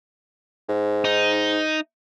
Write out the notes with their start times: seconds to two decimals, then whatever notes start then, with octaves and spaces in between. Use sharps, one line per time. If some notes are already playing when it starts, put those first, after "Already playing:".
0.69 G#2
1.05 D#4